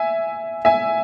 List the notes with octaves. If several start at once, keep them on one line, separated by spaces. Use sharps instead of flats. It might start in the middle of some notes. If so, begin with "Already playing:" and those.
Already playing: E5 G#5
E5 G#5